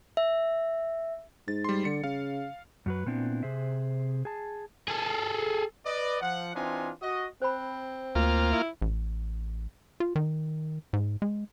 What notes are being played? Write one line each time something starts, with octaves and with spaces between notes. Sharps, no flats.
E5
G#2 A6
G3 C6
D3 C#7
C#3 F5
F#2 F#3 B4
A#2 B3 C4 D4 E4
C3 G#4 C5 E5
G#4 A5
G#4 A4
B4 D5 D#5
F3 F#5
E3 C4 D4 D#4 F4 G#5
F#4 D#5
C4 C5 B5
D2 A#3 F4
E4
A1
F4
D#3
G#2
G#3